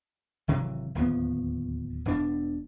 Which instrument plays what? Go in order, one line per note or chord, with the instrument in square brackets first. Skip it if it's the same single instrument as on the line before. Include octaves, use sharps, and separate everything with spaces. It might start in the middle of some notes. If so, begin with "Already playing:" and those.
[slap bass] G#1 C3 E3 F#3
D1 D#2 F3 B3
E1 B2 D4